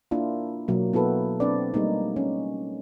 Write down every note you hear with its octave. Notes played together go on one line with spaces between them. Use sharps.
A#3 D4 E4 F4
B2 F#3 A#3
B3 E4 F#4 A4 B4
C4 D4 B4 D5
G3 A3 A#3 D#4
C#4